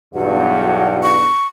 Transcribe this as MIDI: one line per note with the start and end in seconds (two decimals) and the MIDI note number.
0.14 1.28 35
0.14 1.28 40
0.14 1.28 43
0.14 1.13 66
0.14 1.13 78
1.03 1.47 85